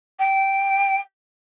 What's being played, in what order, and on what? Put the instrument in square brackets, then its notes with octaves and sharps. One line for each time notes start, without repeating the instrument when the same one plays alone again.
[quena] G5